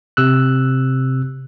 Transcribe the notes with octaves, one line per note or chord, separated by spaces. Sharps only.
C3 E6 F#6